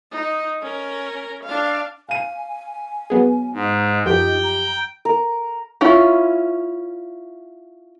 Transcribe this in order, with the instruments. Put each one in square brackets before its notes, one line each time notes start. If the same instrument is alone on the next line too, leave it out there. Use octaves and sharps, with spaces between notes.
[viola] D#4
C#4 A#4
D4 F5
[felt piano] F5 D#7 [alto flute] G#5
[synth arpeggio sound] F#3 B3 G#4
[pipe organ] G#2 [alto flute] D#4
[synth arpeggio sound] F#2 F3 [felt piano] G4 [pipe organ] G5
[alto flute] A#5
[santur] A#4
[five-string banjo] C#4 E4 F4